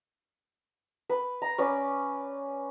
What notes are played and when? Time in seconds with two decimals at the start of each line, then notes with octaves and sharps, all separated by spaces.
1.09 B4
1.42 A#5
1.58 C#4 B4 D5